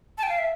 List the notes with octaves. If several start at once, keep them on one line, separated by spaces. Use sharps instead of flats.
A5
G5
F5
E5